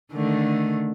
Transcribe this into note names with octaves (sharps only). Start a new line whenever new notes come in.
D3 D#3 A3